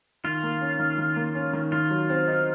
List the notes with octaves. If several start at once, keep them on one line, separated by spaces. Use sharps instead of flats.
D#3 F4
A#3
C#4
D#3
D#3
A#3
C#4
D#3
D#3 F4
F#3
C4
D#4